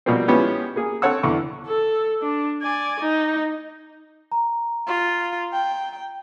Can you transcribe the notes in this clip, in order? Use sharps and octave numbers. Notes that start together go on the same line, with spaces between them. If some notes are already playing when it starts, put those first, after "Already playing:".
B2 F3 G3 A#3 C4
F3 G#3 B3 C#4 E4 G4
A#3 G#4
C4 A4 C#5 F#5 E6
E2 D3 C#6
A4
D4
D5 G#5
D#4
A#5
F4
G5